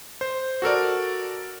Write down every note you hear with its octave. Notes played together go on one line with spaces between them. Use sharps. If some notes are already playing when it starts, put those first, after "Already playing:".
C5
F#4 A4 A#4 D5